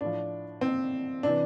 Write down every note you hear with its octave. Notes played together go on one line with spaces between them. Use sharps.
A2 F3 D4
C4
C3 E3 D4